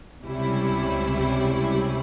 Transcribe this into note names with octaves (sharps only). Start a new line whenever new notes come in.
C#2 C3 G3 C#4 E4